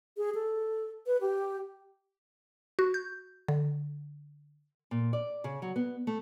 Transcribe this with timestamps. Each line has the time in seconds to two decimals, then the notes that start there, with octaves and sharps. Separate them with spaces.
0.17 G#4
0.35 A4
1.07 B4
1.21 G4
2.79 F#4
2.94 G6
3.48 D3
4.91 A#2
5.13 D5
5.44 C#3
5.62 F#3
5.76 B3
6.07 A3